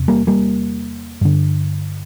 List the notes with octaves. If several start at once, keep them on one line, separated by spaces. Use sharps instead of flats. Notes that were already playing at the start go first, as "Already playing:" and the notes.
Already playing: E2 C3
G3 A#3
G3 A#3
G2 D3